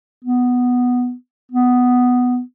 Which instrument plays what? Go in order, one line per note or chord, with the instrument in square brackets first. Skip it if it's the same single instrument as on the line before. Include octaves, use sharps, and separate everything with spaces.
[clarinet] B3
B3